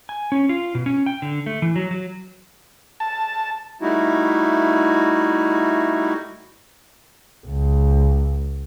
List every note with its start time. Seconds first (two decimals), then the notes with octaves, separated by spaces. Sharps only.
0.09 G#5
0.32 C#4
0.49 F4
0.75 B2
0.86 C#4
1.06 G5
1.22 D3
1.46 A3
1.62 E3
1.76 F#3
1.91 F#3
3.00 A5
3.82 G3 A3 D#4 E4 F#4
7.46 C#2